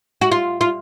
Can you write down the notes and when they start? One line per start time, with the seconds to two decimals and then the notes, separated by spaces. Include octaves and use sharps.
0.21 F#4
0.31 F4
0.61 F4